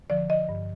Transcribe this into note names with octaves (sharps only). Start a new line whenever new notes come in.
D3 F3 D5
D#5
G2